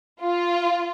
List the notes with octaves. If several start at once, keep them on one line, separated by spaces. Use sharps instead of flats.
F4